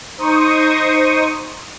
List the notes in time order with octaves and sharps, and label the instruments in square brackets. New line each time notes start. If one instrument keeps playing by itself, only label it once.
[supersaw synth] D#4 C5 C#6 D#6